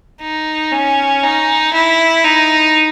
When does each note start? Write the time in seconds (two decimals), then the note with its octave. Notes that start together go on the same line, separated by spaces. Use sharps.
0.22 D#4
0.72 C#4
1.23 D#4
1.74 E4
2.24 D#4